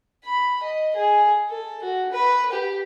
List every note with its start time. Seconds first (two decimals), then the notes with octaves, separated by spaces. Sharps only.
0.25 B5
0.63 D#5
0.96 G#4
1.49 A4
1.83 F#4
2.12 B4
2.52 G4